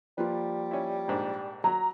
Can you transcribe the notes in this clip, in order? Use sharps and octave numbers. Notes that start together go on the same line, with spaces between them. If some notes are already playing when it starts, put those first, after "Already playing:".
F3 G3 A#3 F4 B4
C#4 E4
A#1 G#2 D4
F#3 A#5